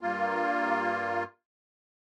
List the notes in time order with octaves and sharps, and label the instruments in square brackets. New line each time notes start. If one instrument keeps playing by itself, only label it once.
[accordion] G2 A#3 F4